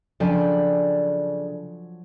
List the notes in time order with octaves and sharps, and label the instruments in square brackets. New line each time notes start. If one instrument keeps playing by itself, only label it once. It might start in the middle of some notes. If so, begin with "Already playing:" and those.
[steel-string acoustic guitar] C#3 D5 G5 [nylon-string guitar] F3 F#3 A5 [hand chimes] D4 A4